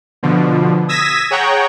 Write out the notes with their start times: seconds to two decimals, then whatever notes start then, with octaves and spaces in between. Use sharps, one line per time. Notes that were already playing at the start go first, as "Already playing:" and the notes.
0.23 B2 D3 F3
0.88 D#6 E6 G#6 A#6 B6 E7
1.30 G#4 C#5 F#5 G5 A#5